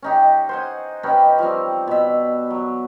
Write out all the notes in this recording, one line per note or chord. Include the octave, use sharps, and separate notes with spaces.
C#4 D#4 G4
C5 F#5 G#5
C#4 D#4 G4 B4
F3 G3 C4
B2 E5
F#3